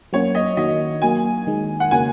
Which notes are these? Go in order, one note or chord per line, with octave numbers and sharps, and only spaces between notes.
F#3 A#3 C#4 F#4 C#5
D#5
D#3 A#3 F#4 D#5
F#3 A#3 F#4 G#5
D#3 G#3 D#4
F#5
C#3 A#3 C#4 F#4 G#5